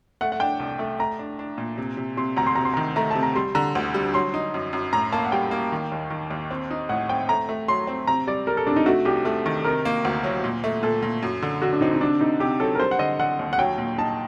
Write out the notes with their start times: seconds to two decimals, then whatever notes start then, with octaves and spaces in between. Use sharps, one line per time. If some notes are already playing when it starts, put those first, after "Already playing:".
0.21 A3 F#5
0.32 F#5
0.40 D4 G5
0.60 C2
0.79 A3
0.99 A3 A#5
1.19 D4
1.39 D4
1.58 A#2
1.78 C3
1.97 C3
2.17 C3 C6
2.37 D2 A#5
2.47 C6
2.56 C3 A#5
2.65 C6
2.74 D#3 A#5
2.96 A3 A#5
3.11 C3 A5
3.23 A#5
3.36 G3 C6
3.55 D3 A#5
3.75 D2
3.94 G3
4.14 F#3 C6
4.34 D#4
4.54 F#2
4.73 F#2
4.93 A2 A#5
5.12 A#3 A5
5.25 F#5
5.32 G3 G5
5.51 A#3
5.72 D#3
5.92 D#2
6.10 D#3
6.31 D#2
6.51 C4
6.71 D#4
6.89 A2 F#5
7.09 C4 G5
7.29 A3 A#5
7.49 A3
7.68 F#3 C6
7.87 C4
8.07 C3 A#5
8.27 G3 D5
8.47 G3 A#4
8.57 A4
8.67 C3 D4
8.76 D#4
8.86 A3 F#4
9.05 C2 G4
9.25 A3 A4
9.46 D#3
9.64 C3 A#4
9.85 A#3
10.05 D2
10.24 F#3
10.44 A#2
10.64 A3
10.83 A#2 A4
11.02 A#2
11.22 F#2
11.42 D3
11.62 D3 F#4
11.73 D4
11.81 C4 D#4
11.94 D#4
12.01 C3 D4
12.21 C3 D#4
12.40 C3 G4
12.60 F#3 A4
12.75 A#4
12.79 G3 C5
12.91 F#5
12.99 D3 D#5
13.19 D3 F#5
13.39 D#2
13.53 F#5
13.59 F#3 G5
13.78 A#2
13.98 D#4 A5